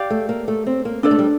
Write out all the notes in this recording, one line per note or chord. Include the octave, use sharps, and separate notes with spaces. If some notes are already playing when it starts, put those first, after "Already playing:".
Already playing: G4 D5 F5
A3
A#3
A3
C4
A#3
A#3 D4 A4 D5
A3
G3